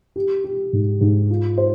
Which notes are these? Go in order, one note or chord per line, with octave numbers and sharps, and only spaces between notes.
G4
G4
G#2
G#2
F4
C5